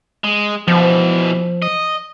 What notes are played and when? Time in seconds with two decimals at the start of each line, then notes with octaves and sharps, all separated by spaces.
0.24 G#3
0.68 B2 E3 F3
1.62 D#5